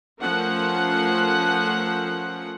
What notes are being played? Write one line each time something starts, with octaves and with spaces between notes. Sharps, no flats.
F3 A3 C#4 A#4 C5 F#5